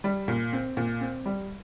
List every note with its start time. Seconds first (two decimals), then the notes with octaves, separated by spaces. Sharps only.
0.04 G3
0.28 A#2
0.53 C4
0.77 A#2
1.01 C4
1.26 G3